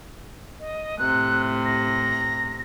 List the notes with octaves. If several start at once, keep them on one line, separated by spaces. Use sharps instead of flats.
D#5
A2 C3 F#6
A#6